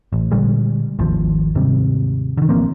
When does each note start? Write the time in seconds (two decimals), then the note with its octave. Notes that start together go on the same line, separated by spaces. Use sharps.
0.13 A1
0.32 A#2 D3 G3 G#3
0.99 G#1 D#2 F3
1.55 D#2 G#2 C3 G3
2.38 D3 D#3
2.49 A1 F3 A#3 C4